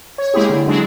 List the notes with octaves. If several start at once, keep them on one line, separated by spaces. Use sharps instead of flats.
C#5
G#3 A#3 E4 G4 G#4
D3
F#3 G#3 D4 E4 G#4